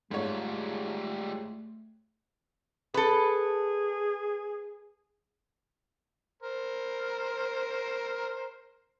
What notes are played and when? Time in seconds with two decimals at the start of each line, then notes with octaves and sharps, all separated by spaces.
0.11 G#2 G3 A3 F4 C#5
2.94 G#4 A4 B4
6.43 A#4 C5